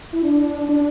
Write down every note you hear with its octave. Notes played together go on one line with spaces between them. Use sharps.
E4
D4
D4